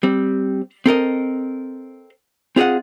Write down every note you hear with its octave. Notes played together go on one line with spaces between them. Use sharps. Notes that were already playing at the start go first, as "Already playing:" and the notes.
G3 C4
C4 A4 A#4 D#5
C4 F4 G#4 D#5 F#5